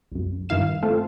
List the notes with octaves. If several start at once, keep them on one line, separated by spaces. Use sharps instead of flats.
C2 F#2
G2 D#3 E4 F5 E7
A3 C4 F4 A4